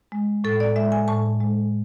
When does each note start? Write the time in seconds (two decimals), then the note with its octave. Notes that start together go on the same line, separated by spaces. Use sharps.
0.12 G#3
0.44 A2 A4
0.60 D5
0.76 G#3 E5
0.92 G#5
1.08 A2 A5
1.40 G#3